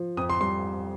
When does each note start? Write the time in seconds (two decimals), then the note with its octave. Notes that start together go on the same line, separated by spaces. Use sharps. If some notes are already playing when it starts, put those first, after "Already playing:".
Already playing: F3
0.17 F2 D#6
0.30 C6
0.41 G3 C6